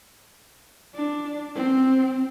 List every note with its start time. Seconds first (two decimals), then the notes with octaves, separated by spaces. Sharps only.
0.95 D4
1.55 C4